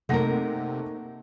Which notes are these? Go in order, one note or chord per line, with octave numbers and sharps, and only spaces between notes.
C3 A3 A#3 D#4 A#4 F#5 A#6